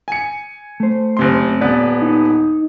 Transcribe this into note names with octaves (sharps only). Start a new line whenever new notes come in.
G#5 C#7
A3 C5
F#1 C3 C6
D#1 B3 B4 D5
D#4